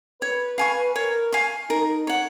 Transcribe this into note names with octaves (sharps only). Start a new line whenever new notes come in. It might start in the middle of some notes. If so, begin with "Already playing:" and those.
B4 C#5
F5 G#5 C#6
A#4 C#5
F5 G#5 C#6
D#4 A#4
C#5 F#5